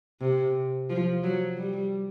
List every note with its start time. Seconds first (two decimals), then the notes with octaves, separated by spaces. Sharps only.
0.21 C3
0.90 F3
1.24 F#3
1.58 G3